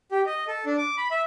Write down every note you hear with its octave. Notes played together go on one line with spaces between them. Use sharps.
G4
D#5
A4
D4
D6
B5
E5